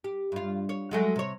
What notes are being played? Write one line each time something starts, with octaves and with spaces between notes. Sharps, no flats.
G4
G2 F4
C#5
F#3 G#3 A3
C3 C#5